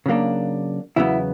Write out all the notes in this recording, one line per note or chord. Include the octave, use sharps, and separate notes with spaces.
C#3 F#3 A#3 D4
E2 C#3 F#3 B3 E4